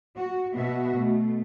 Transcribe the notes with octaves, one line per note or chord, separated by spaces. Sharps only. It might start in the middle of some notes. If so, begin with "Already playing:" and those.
F#4
B2 B3 F#4 E5
B2 A3